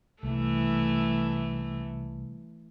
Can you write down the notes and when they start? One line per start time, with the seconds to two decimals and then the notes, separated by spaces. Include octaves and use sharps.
0.23 C2 E3 A3